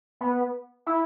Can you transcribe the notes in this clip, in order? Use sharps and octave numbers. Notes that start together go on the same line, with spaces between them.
B3
E4